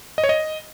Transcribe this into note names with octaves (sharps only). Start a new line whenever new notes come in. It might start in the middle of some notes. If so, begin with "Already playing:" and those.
D#5
C#5
D#5